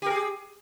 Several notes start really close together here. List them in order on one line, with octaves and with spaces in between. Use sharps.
G4 A#4 G#4